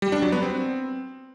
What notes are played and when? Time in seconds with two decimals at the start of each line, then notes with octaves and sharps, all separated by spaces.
0.02 G3
0.12 D4
0.22 F#3
0.32 B3
0.42 C4